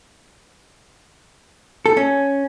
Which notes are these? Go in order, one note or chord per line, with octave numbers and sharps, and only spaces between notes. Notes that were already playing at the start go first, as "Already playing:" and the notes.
A4
C#4